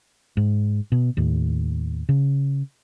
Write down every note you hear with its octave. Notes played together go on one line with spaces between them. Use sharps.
G#2
B2
D#2 A2
C#3